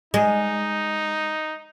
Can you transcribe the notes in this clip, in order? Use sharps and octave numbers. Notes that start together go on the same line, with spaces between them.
G#3 D#4